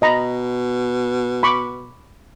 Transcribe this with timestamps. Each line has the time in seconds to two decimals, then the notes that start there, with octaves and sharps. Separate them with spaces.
0.02 B2 D#5 A#5 B5
1.43 B5 C#6 D6